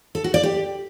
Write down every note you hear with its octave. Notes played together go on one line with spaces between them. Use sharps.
A4
F#4
D5
G4